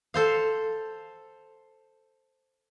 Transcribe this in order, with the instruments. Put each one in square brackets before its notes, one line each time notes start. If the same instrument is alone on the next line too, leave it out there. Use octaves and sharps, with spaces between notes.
[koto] A4 C5 F5